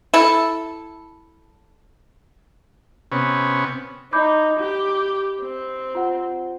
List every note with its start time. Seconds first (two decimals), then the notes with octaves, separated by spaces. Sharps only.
0.14 E4 A4
3.12 C3 B3 C#4
4.13 D#4 B5 D6 G6
4.60 G4
5.40 C4
5.95 F4 C5 F#5